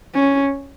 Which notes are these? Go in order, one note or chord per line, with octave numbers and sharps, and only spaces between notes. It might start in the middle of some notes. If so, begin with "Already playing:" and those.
C#4